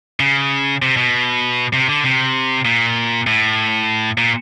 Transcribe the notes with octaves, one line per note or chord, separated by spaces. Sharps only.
C#3
C3
B2
C3
D3
C3
A#2
A2
A#2